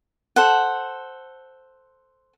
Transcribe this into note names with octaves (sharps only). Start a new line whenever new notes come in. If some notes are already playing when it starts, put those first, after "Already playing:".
A4 C5 F#5